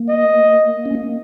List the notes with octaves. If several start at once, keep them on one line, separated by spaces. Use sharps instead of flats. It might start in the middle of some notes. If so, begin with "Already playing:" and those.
Already playing: A#3
D#5
C#4
A#3